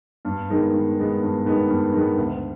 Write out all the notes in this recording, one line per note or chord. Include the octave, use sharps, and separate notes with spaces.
G2
D#3 G#3 B3
G2
D#3 G#3 B3
G2
D#3 G#3 B3
G2
D#3 G#3 B3
D2